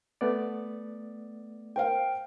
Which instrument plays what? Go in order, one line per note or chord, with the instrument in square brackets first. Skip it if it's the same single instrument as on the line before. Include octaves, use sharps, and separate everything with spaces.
[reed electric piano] A3 B3 D5
[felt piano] A#4 C5 F5 [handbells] G5